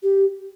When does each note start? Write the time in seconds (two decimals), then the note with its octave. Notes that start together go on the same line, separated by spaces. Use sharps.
0.03 G4